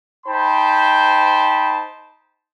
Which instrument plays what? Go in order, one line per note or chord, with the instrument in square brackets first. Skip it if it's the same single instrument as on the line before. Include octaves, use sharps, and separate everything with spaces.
[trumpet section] D#4 C5 G5 A5 B5